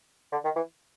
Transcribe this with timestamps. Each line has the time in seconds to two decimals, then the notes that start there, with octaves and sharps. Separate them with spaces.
0.32 D3
0.44 D#3
0.56 E3